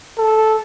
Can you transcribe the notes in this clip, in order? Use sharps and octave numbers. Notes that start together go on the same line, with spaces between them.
A4